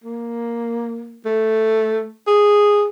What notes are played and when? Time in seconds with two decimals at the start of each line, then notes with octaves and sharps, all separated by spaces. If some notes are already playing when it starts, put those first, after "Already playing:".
0.04 A#3
1.25 A3
2.27 G#4